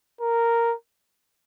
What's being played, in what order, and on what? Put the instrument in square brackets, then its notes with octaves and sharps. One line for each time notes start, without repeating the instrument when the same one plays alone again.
[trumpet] A#4